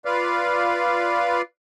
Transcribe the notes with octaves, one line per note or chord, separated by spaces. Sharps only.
F4 B4 D5 F5